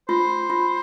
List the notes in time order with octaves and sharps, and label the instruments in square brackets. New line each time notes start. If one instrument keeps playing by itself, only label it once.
[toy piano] F4 [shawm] C5
[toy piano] F4